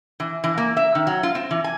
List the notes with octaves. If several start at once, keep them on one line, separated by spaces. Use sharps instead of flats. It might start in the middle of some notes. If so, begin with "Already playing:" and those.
E3
E3
A#3
E5
D#3
F#3
F4
C4
E3
G#5